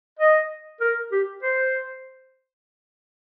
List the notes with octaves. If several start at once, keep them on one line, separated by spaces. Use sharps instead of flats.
D#5
A#4
G4
C5